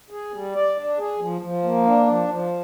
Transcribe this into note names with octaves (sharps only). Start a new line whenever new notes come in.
G#4
G3
D5
D4
G#4
F3
F3
A#3
D4
F3
F3